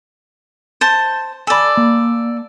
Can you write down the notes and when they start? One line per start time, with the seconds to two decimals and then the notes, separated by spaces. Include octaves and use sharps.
0.81 C5 A5
1.47 A4 D5 G#5 B5
1.77 A#3